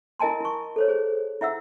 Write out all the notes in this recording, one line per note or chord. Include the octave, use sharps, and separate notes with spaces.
E4 A#4 D#5 G#5 A5 C6
E4 C#6
A4 C5 C#5
G#4 C5
E4 E5 F#5 E6